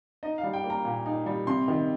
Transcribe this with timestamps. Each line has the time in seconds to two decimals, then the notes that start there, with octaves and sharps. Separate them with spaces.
0.23 D#4 D#5
0.38 F5
0.43 G3
0.53 G5
0.64 A#3
0.70 A#5
0.85 A#2
1.06 D#4
1.26 G3
1.47 C3 C6
1.68 D#3